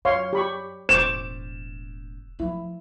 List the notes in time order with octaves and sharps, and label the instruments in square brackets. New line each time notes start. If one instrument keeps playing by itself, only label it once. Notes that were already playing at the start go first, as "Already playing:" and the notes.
[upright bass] F#2 [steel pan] C#5 F5 C6
[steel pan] G4 B5 C#6
[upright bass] E1 A2 [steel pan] C5 C#6 D6 [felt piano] E7
[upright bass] F3 [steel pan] E4